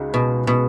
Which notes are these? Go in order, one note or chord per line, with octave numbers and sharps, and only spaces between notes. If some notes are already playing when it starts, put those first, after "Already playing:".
Already playing: C#2 C#3 G#3 D#4 F#4
B2
B2